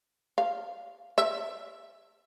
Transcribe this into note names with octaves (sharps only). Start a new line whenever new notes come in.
F5
E5